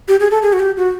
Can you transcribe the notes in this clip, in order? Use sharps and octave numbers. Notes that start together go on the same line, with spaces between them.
G4
G#4
A4
G#4
F#4
G4
F#4